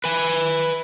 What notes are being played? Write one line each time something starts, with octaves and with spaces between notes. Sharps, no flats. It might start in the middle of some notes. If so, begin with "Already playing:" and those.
B4 G#5